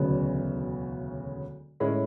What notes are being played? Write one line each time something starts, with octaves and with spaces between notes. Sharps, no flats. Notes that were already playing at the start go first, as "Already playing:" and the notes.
Already playing: E1 D2 C#3 F#3 B3
A2 G#3 C#4 E4